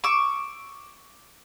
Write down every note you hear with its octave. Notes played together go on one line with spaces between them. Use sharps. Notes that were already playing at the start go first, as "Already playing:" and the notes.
C#6 D6 E6